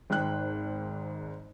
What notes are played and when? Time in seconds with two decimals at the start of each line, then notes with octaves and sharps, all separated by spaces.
0.10 G#1 G#2 G5 F#6